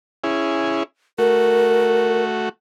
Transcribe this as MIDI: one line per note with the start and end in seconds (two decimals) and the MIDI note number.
0.24 0.83 61
0.24 0.83 64
0.24 0.83 68
1.18 2.49 57
1.18 2.49 66
1.18 2.23 70